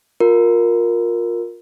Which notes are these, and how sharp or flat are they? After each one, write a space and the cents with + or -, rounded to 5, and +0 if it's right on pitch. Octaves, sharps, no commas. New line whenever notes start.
F4 +25 A#4 +0